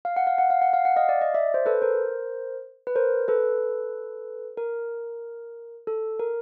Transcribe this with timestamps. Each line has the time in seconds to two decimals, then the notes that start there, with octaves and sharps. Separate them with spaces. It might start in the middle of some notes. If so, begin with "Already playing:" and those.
0.05 F5
0.16 F#5
0.27 F5
0.38 F#5
0.50 F5
0.62 F#5
0.73 F5
0.85 F#5
0.96 D#5 F5
1.09 D5
1.21 D#5
1.34 D5 E5
1.54 C5
1.66 A4 B4
1.82 A#4 C5
2.87 B4
2.96 A#4 C5
3.28 A4 B4
4.57 A#4
5.87 A4
6.19 A#4